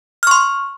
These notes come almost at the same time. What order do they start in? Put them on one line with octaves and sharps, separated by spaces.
F6 C#6 C6